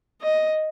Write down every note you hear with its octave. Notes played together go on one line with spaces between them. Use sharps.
D#5